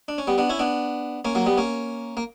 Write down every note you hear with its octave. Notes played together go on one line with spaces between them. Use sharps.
D4
C#4
G3 B3
B3 D4
C#4 E4
B3 D4
A#3 C#4
F#3 A#3
G3 B3
A#3 C#4
A#3